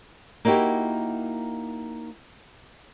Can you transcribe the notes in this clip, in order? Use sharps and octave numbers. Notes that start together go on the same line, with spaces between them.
A#3 D#4 E4 F#4 G4